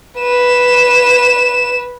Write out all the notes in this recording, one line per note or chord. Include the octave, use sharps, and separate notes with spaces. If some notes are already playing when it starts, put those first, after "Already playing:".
B4 E7